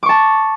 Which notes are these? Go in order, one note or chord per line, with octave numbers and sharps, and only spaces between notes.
A5 C#6 D6